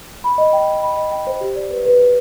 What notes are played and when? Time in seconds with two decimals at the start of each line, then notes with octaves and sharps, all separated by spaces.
0.24 B5
0.38 D#5
0.53 G5
0.68 D#5
0.83 B5
0.97 D#5
1.12 G5
1.27 C5
1.41 G4
1.56 D5
1.70 B4
1.85 B4
2.00 B4